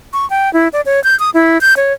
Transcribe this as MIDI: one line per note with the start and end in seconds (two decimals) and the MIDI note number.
0.13 0.28 85
0.30 0.52 79
0.53 0.68 64
0.73 0.81 74
0.86 1.03 73
1.04 1.18 91
1.20 1.30 87
1.34 1.61 64
1.61 1.74 91
1.77 1.93 73